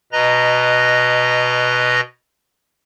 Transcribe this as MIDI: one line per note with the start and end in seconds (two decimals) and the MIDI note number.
0.12 2.01 47
0.12 2.01 71
0.12 2.01 75
0.12 2.01 82
0.12 2.01 94